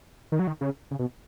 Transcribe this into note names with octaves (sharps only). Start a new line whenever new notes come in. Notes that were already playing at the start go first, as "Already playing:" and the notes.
D#3
F#3
D#3
C#3
C#3
B2